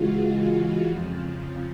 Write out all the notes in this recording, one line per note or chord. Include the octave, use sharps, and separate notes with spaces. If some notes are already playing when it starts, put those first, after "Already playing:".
Already playing: C#3 E3 G#3 F4 F#4
F2 C#3 F3